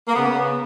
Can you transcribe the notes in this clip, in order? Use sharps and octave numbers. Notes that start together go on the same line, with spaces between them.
A#3
C#3 B3